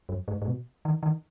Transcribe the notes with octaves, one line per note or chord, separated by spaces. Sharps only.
F#2
G#2
G#2
B2
D#3
D#3